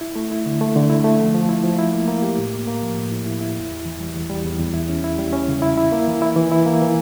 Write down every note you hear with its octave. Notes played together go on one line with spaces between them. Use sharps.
E4
A3
E4
D3
A3
D3
E4
A3
F3
F3
E4
F3
E4
A#3
A#3
G4
A2
A#3
A#3
F3
A2
E4
E4
E4
E2
E2
E3
G3
E2
G3
E2
E2
E4
C#4
E4
G3
C#4
C#3
E4
E4
A#3
E3
E4
E3
E4
A#3
E3